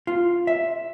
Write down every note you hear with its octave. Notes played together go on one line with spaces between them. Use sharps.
F4
E5